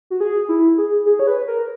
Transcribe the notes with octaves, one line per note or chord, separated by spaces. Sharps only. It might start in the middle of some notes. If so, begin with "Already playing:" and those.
F#4
G#4
E4
G#4
G#4
C#5
B4
A#4